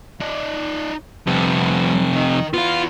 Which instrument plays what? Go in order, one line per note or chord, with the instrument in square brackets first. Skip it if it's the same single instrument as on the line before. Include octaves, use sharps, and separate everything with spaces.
[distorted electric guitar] D#4 D5
[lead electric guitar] F2 C3 [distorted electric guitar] G3 B3
[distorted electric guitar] D#3 D#5
[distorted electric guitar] B3 E4 [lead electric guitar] F4 F5